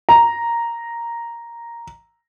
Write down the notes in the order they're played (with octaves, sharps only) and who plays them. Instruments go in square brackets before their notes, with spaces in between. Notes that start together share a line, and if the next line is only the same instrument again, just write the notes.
[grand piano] A#5